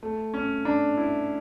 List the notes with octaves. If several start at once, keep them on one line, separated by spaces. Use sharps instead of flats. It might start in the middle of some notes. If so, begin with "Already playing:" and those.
A3
C#4
D4
E4